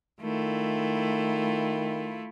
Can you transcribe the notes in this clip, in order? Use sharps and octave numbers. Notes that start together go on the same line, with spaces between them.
D#3 A3 E4 F4